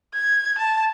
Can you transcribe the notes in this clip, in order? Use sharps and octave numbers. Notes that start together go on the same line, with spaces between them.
G#6
A5